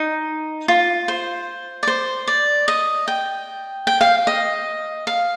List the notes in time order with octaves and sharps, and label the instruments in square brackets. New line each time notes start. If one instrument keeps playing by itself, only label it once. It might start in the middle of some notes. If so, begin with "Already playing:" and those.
Already playing: [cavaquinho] D#4
F4
C5
D5
C5
D5
D#5
G5
G5
F5
D#5
F5